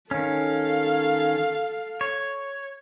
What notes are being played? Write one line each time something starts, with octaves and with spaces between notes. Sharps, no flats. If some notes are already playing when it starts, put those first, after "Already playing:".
D#3 C#4 A4 F5
C#5